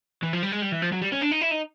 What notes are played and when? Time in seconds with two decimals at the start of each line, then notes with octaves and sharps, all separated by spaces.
0.23 E3
0.33 F3
0.43 G3
0.52 G#3
0.62 G3
0.72 E3
0.82 F3
0.92 F#3
1.02 G3
1.12 C#4
1.21 D4
1.31 D#4
1.41 E4
1.51 D#4